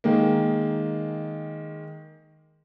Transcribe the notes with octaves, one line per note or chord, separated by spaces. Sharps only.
D#3 G#3 A#3